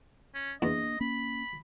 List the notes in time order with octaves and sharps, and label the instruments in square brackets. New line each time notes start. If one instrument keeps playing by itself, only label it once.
[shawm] C#4
[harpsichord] E2 [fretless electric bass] A#3 C#4 D4 [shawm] D#5
[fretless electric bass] A#3 C#4 [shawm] B5